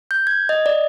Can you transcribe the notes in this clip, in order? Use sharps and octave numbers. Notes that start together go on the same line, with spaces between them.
G6
G#6
D#5
D5